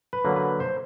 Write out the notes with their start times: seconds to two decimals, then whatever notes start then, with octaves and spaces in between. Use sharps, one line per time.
0.13 B4
0.25 D3 F#3 A#3
0.36 B4
0.60 C5